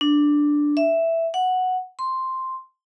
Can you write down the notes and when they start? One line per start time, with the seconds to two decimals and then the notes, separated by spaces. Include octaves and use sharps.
0.01 D4
0.77 E5
1.34 F#5
1.99 C6